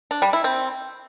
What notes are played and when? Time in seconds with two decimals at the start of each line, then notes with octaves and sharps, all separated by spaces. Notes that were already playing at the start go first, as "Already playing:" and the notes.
0.11 D4
0.22 G3
0.33 E4
0.44 C4